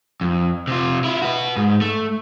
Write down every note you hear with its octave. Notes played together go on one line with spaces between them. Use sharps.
F2
C3 F4
E4 F4
F#4 B4
G#2
A3